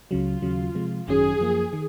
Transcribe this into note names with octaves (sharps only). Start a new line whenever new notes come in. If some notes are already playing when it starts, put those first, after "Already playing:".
C#2 C#3 F#3 F4
D#2 C#3 F#3
C3 F3 G#3
G#1 F#2 D#3 F#3 C#4 G#4
F#2 F3 A#3
D#3